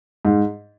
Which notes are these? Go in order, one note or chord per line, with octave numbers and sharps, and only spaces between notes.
G#2